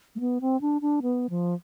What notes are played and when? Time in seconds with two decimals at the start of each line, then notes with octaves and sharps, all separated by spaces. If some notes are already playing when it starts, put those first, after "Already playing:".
0.16 A3
0.20 B3
0.41 C4
0.61 D4
0.82 D4
1.02 B3
1.30 F3